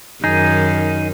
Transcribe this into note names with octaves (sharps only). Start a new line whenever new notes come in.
F#2 D#3 D#4 G#4